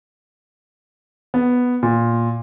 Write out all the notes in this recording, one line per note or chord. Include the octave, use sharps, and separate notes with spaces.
B3
A#2